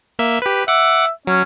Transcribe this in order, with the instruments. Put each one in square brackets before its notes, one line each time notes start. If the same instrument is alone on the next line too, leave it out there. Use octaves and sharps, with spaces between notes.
[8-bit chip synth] A#3 E5
G4 B4
[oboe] E5 [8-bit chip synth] F#5 D6
[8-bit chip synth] F#3 [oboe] C#4